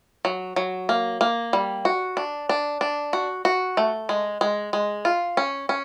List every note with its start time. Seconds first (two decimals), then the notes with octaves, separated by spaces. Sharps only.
0.25 F#3
0.56 F#3
0.89 A#3
1.21 A#3
1.53 G3
1.85 F#4
2.17 D4
2.49 D4
2.81 D4
3.13 F#4
3.45 F#4
3.77 A3
4.09 G#3
4.41 G#3
4.73 G#3
5.05 F4
5.37 C#4
5.69 C#4